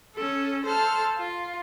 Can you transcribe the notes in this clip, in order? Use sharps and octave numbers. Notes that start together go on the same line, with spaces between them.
C#4 A4
A4 C5 A5 F6
F4